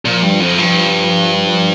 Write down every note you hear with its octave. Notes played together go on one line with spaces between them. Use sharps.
A#2 F3
G2
F2
G2